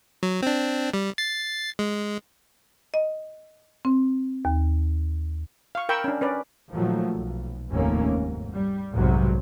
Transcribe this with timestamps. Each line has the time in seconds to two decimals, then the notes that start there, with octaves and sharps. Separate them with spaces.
0.23 F#3
0.42 C4 D4
0.94 G3
1.18 A6 C7
1.79 G#3
2.94 D#5
3.85 C4
4.45 D#2
5.75 F5 C#6
5.89 A#4 G5 B5 C#6 E6
6.04 C#4 D4
6.21 C#4 B4 D5
6.73 A#2 D#3 F3 F#3 A3
7.16 B1
7.71 F1 D#2 A2 A3 A#3 C#4
8.10 G#2
8.54 G3
8.92 B1 F2 G#2 C3 F#3